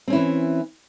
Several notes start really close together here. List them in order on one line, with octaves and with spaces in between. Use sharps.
C4 C#4 E4 E3